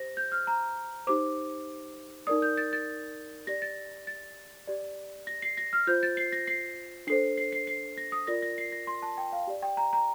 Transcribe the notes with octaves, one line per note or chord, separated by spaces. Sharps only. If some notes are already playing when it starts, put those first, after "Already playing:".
Already playing: G4 C5 A#6
G6
F6
A#5
D#4 G4 C5 D6
D#4 A#4 D5 D#6
G6
A6
A6
G4 D5 A#6
A6
A6
G4 D5
A#6
C7
A#6
F6
F4 C5 G6
A6
C7
A#6
C7
D4 A4 C5 C7
C7
C7
C7
A#6
D#6
F4 A#4 D5 A#6
A#6
C7
A#6
C6
A5
G5
F5
G4 D5
G5
A#5
A#5